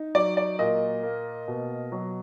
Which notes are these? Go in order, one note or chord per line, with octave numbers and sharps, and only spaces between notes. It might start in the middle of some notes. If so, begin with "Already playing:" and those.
Already playing: D#4
F#3 D5
D5
A#2 D#5
A#3
B2
F#3